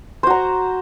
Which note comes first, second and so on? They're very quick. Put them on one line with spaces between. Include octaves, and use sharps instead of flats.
C5 F#4 A#5